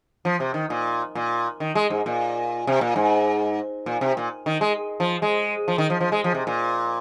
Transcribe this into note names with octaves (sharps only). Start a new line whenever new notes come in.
F3
C3
D#3
A#2
A#2
D#3
G#3
G#2
A#2
C3
A#2
G#2
A#2
C3
A#2
D#3
G#3
F3
G#3
F3
D#3
F3
F3
G#3
F3
C3
A#2